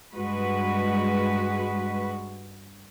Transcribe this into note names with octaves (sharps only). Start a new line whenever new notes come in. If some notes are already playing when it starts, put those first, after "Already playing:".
G2 G#3 F#4 B4